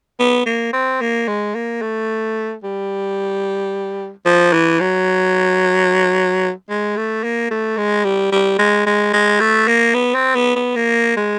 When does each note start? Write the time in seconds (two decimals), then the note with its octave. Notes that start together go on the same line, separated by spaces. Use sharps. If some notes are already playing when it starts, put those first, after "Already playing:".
0.19 B3
0.46 A#3
0.73 C4
1.01 A#3
1.28 G#3
1.55 A#3
1.82 A3
2.64 G3
4.26 F3
4.53 E3
4.80 F#3
6.69 G#3
6.97 A3
7.24 A#3
7.51 A3
7.77 G#3
8.05 G3
8.32 G3
8.59 G#3
8.86 G#3
9.13 G#3
9.40 A3
9.68 A#3
9.94 B3
10.15 C4
10.35 B3
10.56 B3
10.76 A#3
11.16 G#3